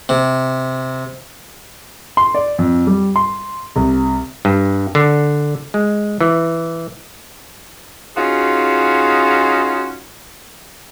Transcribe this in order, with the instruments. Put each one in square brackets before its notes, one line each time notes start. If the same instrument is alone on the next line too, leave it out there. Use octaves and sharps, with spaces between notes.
[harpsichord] C3
[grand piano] C6
D5
F2
G3
C6
C2
[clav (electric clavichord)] G2
D3
G#3
E3
[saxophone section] C#4 D#4 F4 F#4 G#4